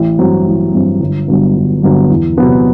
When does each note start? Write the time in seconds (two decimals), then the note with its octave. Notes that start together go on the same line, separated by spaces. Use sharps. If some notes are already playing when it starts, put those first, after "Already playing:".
Already playing: A1
0.19 G2 F#3 C4
0.46 A1
0.72 G2 F#3 C4
1.00 G1
1.28 G2 D3 F#3 B3
1.55 G1
1.82 G2 D3 F#3 B3
2.10 E2
2.37 C3 F#3 B3 E4